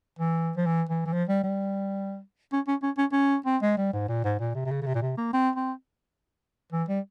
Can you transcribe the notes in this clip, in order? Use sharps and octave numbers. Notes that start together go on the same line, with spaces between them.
E3
F3
E3
E3
E3
F3
G3
G3
C#4
C#4
C#4
C#4
C#4
C4
G#3
G3
G#2
A#2
G#2
A#2
C3
C3
C#3
C#3
C3
A#2
C3
A#3
C4
C4
E3
G3